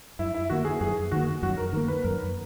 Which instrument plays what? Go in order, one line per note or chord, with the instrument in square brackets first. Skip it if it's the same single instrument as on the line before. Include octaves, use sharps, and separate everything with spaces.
[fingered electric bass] F#2 [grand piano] E4
[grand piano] E4
[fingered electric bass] D#3 A#3 [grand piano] F#4
[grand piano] G#4
[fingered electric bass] F#2 [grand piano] G#4
[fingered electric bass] D#3 A#3 [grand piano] F#4
[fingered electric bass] F#2 [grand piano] F#4
[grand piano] A#4
[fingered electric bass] D#3 [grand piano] A#4
[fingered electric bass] A#3
[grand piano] B4
[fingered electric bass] F#2 [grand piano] A#4